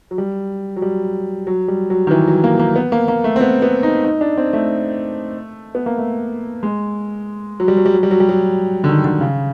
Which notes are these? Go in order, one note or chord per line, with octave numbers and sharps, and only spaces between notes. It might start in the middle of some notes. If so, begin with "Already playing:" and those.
F#3
G3
F#3
G3
F#3
G3
F#3
D#3
E3
F#3
A#3
A#3
B3
A#3
A#3
A3
C4
B3
B3
D#4
D#4
D4
C4
A3
B3
A#3
A3
G#3
F#3
G3
F#3
G3
F#3
G3
F#3
G3
F#3
D3
D#3
D3
C#3